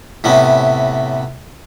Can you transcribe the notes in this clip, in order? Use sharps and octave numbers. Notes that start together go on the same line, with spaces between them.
A2 C3 B3 C#4